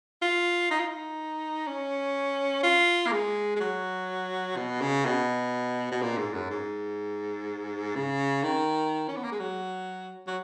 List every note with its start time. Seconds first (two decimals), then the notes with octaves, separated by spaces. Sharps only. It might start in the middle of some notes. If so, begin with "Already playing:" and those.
0.22 F4
0.71 D#4
0.80 F4
0.88 D#4
1.67 C#4
2.63 F4
3.07 A#3
3.12 G#3
3.56 G#3
3.60 F#3
4.57 B2
4.81 C#3
5.05 B2
5.92 B2
6.02 A#2
6.18 G#2
6.34 F#2
6.50 G#2
7.95 C#3
8.43 D#3
9.08 C#4
9.16 B3
9.24 A#3
9.32 G#3
9.40 F#3
10.27 F#3